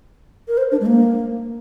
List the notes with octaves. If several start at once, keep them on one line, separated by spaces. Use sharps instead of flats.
A#4
C5
D4
G#3
A#3